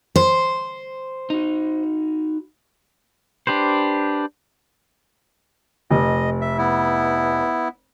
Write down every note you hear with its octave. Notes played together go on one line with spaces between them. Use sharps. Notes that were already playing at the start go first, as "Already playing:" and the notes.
C5
D#4 F#4
D4 G4 B4 C5
F1 D#5
E5
B3 E4